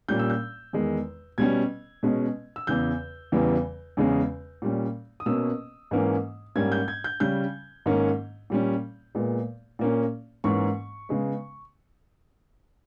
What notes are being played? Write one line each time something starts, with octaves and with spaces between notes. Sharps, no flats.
A#2 G3 C#4 G6
E6
G6
E2 D#3 G#3
B2 G3 C#4 G#6
B2 G#3 C#4
E6
E2 C#3 E3 G6
E2 C#3 E3 G3
E2 C#3 G#3 C#4
A#2 G3 C#4
D#6
B2 A#3 C#4 E6
G#2 E3 A#3 C#4
G#2 G3 A#3 C#4 G#6
G6
G#6
G6
C#3 G3 C#4 G6
G#2 D#3 A#3 C#4
A#2 G3 C#4
A#2 G#3 B3
A#2 A#3 C#4
G#2 E3 A#3 C#4 C#6
C#3 G#3 B3